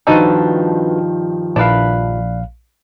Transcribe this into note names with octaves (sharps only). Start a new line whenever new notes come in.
G2 D#3 F3 D4 D#4 F#4 A4 B4
A#1 D4 E4 B4 F5